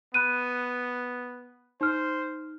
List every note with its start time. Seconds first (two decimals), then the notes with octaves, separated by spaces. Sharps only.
0.14 B3 B5 F#6 D#7
1.81 D#4 C5 F6